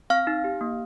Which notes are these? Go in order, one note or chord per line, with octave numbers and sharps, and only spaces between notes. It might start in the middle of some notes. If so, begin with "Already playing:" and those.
C4 F5 F6
D#4
G4
A#3